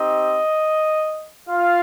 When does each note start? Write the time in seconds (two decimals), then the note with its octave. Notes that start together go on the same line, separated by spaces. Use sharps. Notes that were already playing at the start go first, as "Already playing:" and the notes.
Already playing: C4 D#4 G4 D#5
1.48 F4 F5